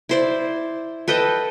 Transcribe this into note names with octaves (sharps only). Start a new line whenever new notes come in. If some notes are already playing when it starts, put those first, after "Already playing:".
E4 C5 D5
A4 B4 D#5 G5